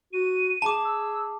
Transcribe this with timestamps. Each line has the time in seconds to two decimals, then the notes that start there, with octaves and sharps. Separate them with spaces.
0.13 F#4 D#7
0.62 G#4 A5 D6
0.85 E6